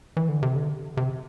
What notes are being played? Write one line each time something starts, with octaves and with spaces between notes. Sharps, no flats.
E3
D3
C3
D3
C3